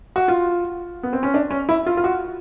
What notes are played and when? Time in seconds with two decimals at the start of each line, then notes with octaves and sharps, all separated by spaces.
0.16 F#4
0.28 F4
1.03 B3
1.13 C4
1.23 C#4
1.34 D4
1.51 C#4
1.69 E4
1.86 F4
1.97 F4
2.04 F#4